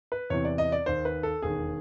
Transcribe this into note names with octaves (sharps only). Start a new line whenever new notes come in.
B4
E2 C3 E3 C#5
D5
D#5
D5
D#2 D#3 C5
B4
A4
E1 D#2 D#3 G#4